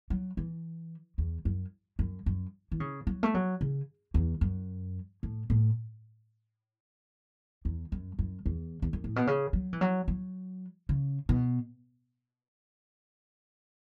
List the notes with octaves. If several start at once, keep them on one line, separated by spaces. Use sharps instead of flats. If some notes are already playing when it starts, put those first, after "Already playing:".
F#3
E3
E2
F#2
F#2
F#2
E3
C#3
F#3
A3
F#3
C#3
E2
F#2
A2
A2
E2
F#2
F#2
E2
E2
F#2
A2
B2
C#3
F#3
E3
F#3
F#3
C#3
B2